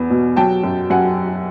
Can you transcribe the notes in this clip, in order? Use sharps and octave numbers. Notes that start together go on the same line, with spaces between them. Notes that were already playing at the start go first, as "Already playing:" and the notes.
Already playing: E2 B3
B2
F#3 G5 A5
F#2
F#2 F#5 G#5